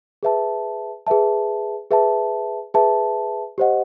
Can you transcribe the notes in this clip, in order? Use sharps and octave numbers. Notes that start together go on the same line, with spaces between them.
G#4 B4 E5 A5
G#4 B4 E5 A5
G#4 B4 E5 A5
G#4 B4 E5 A5
G4 C5 D#5 F#5